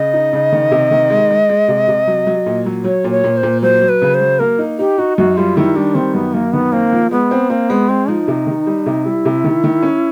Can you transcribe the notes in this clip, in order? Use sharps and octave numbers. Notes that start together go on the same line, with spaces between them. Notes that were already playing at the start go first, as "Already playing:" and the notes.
Already playing: C#3 D#5
D#4
C#3
D#3
C3
D#3
G#3
G#3
G#3
C3
C3
F#3
F#3
A#2
F#3
F#3 C#5
A#2
C#5
A#2
C5
A#2
F#3 C5
F#3
B4
C#3
C5
F#3
A#3 A#4
D#4
D#4 G4
D#4 F#4
F#2 F#4
G3 F4
D#3 E4
G3 D4
D#3 C4
F#2 B3
F#2 A#3
D#3 B3
A#3 C4
F3
G#3 B3
C4
A#3 C4
G#3 B3
G#3 C4
F3 D#4
C3
D#3
G3
C3
G3 E4
C3
D#3
D#3
C#4